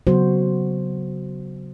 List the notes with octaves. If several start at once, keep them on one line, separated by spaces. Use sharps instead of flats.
C#3 F#3 B3 F#4 C5